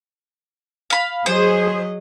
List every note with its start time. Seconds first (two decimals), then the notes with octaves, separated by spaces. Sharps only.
0.90 F5 B5
1.26 F#3 G#4 C5 D#5